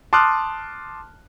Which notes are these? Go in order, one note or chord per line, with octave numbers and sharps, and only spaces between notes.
A5 C6 D6 D#6 F6 F#6